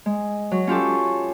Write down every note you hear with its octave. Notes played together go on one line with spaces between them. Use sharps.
G#3
F#3
C#4 F4 G4 A4